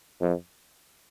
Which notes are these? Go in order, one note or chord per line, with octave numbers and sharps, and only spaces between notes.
F2